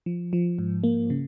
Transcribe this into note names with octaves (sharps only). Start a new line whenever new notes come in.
F3
F3
G#2
A#3
C#3